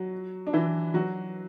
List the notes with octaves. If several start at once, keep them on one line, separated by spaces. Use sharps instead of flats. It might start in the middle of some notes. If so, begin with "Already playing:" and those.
Already playing: F#3 F#4
D4
E3 E4
F#3 F#4